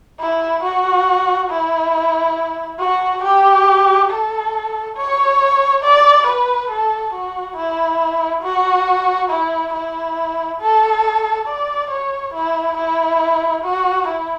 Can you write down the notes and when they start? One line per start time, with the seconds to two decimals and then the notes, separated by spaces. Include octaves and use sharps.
0.20 E4
0.63 F#4
1.50 E4
2.80 F#4
3.24 G4
4.10 A4
4.97 C#5
5.83 D5
6.27 B4
6.70 A4
7.14 F#4
7.56 E4
8.43 F#4
9.30 E4
9.73 E4
10.61 A4
11.48 D5
11.91 C#5
12.34 E4
12.77 E4
13.64 F#4
14.08 E4